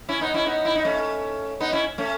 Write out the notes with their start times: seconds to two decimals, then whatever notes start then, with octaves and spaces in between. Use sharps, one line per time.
0.09 C#4 E4
0.21 B3 D#4
0.34 C#4 E4
0.46 B3 D#4
0.65 E4
0.75 D#4
0.85 A3 C#4
1.60 B3 D#4
1.72 C#4 E4
1.98 A3 C#4